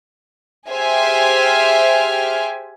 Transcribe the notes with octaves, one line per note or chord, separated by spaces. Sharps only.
G4 G#4 C5 E5 G#5 F6